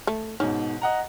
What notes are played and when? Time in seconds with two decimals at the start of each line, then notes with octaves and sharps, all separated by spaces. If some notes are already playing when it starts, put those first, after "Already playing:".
0.07 A3
0.40 G#2 B2 C#4
0.82 D#5 F#5 A#5